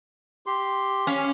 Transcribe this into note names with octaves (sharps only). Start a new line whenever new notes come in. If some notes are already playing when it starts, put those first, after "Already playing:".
G4 C6
C#4 F5